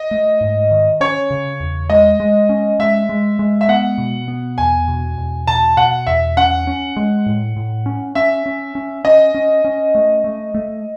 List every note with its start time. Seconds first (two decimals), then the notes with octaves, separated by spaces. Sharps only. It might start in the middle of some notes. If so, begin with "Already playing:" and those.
Already playing: D#5
0.11 A3
0.41 G#2
0.71 D#3
1.00 C#4 C#5
1.30 C#3
1.60 E2
1.90 G#3 D#5
2.20 G#3
2.49 C#4
2.79 G#3 E5
3.09 G#3
3.39 G#3
3.61 E5
3.69 B3 F#5
3.98 B2
4.28 B3
4.58 E2 G#5
4.88 B2
5.18 E2
5.47 B2 A5
5.77 B2 F#5
6.07 E2 E5
6.37 C#4 F#5
6.67 C#4
6.96 G#3
7.26 A2
7.56 A2
7.86 C#4
8.15 C#4 E5
8.46 C#4
8.75 C#4
9.04 C#4 D#5
9.34 C#4
9.65 C#4
9.95 A3
10.24 A3
10.54 A3